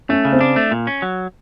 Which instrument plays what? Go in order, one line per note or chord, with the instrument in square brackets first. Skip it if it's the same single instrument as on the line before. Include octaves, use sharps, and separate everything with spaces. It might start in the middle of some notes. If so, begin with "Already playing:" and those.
[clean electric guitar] A3 [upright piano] C#4
[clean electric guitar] C#3
[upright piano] C4
[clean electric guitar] D4
A3
A#2
C#4
F#3